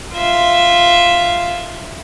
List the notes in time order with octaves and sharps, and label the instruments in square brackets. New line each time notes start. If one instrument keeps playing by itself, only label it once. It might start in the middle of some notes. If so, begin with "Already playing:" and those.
[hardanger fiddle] F4 E5